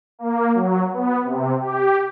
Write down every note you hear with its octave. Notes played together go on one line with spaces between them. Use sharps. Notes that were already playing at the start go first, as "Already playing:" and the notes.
A#3
F#3
B3
C3
G4